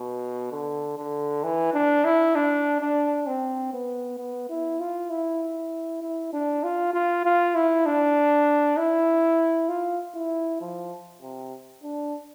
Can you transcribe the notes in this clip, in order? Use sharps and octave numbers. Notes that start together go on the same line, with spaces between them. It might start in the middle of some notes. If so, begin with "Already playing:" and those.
Already playing: B2
D3
D3
E3
D4
E4
D4
D4
C4
B3
B3
E4
F4
E4
E4
D4
F4
F4
F4
E4
D4
E4
F4
E4
F3
C3
D4